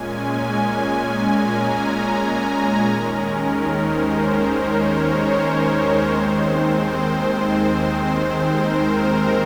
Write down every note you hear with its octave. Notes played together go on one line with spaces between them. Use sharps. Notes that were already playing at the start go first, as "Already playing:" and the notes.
Already playing: A#2 G#3 C#4 G#5
A#5
G#5
D#2 D#3 G#3 C#4 A#4
C5
C#5
C5
D#2 D#3 G#3 C4
C5
A#4